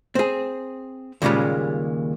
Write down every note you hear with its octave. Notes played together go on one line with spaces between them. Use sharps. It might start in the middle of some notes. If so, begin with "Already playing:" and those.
C4 G#4
D#2 A#2 C#3 G3 G#3